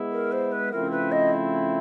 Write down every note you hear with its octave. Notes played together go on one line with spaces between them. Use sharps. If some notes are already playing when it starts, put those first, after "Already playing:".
Already playing: G#3 B3 E4
A#4
C5
B4
C#3 F3 A3 C4 E4 A#4
B4
D#5